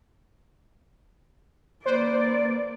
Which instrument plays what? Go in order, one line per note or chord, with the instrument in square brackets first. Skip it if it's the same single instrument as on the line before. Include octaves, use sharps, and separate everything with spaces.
[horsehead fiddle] A#3 D5 [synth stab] B4 C5